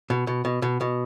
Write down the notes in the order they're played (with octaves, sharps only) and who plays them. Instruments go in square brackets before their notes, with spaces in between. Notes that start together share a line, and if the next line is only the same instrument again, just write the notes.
[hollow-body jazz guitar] B2
B2
B2
B2
B2